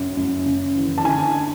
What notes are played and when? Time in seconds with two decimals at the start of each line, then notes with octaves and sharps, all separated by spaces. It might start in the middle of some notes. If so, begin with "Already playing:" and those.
Already playing: F#2 C#3
0.17 F#2
0.46 C#3
0.76 E3
0.98 A5
1.04 D3 G#5